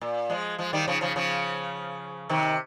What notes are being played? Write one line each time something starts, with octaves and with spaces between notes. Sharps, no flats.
A#2
F3 G#3
F3 G#3
D#3 G3
C#3 F3
C#3 F3
C#3 F3
C3 D#3